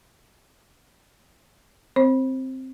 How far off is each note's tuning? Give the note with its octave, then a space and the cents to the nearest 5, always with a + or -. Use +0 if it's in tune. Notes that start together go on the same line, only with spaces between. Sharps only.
C4 +0 C5 +25